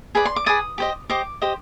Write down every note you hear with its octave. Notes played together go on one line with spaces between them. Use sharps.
G#4 B4 D5 B5
C6
D6
G#4 B4 D5 D#6
G4 C5 D#5
G4 C5 D#5 D6
G4 C5 D#5